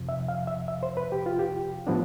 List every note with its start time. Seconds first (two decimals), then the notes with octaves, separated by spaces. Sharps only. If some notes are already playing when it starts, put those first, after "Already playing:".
Already playing: F2 C3 F3
0.09 E5
0.28 F5
0.47 E5
0.68 E5
0.83 C5
0.97 B4
1.12 G4
1.26 F4
1.39 G4
1.87 A2 F3 B3 D4